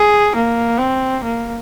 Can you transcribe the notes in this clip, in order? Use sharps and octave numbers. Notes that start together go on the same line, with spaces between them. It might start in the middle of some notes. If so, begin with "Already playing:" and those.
Already playing: G#4
A#3
C4
A#3